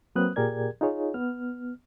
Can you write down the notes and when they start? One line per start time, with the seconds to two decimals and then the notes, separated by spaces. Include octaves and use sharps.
0.15 F#3 A#3 C4 B4 D#6 F#6
0.36 A#2 G4 G#4 A#4 D5 G#6
0.81 D#4 F4 G#4 C#5
1.14 B3 F6